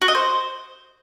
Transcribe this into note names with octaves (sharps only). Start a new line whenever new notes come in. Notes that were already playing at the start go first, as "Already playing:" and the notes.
F#4
D#5
C5